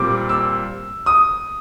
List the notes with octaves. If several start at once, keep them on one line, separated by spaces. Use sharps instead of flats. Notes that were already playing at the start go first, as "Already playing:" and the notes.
Already playing: A#2 G3 C4 D6
E6
D#6